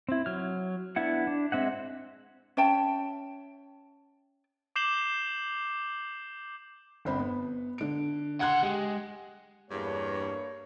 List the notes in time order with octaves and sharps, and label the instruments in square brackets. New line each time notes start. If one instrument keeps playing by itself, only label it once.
[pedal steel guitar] C4 E4
F#3 F6
B3 D4 E4 F#5
D4
G#3 C4 E5 F#5
[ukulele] C#4 E5 G5 A5
[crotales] D6 G6 C7 E7 F#7 G7
[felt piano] G1 C4 B5
B3
D3 D7
[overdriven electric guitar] C#3 F#5 [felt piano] C6 F#6 G#6
[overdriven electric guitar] G#3 [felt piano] G4
[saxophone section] E2 G2 [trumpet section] A#3 C#5